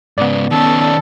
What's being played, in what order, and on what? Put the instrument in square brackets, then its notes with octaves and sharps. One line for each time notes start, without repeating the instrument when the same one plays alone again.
[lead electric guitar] G#2 C#3 [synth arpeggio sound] B3 D5
[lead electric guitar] D#3 C#4 [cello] A4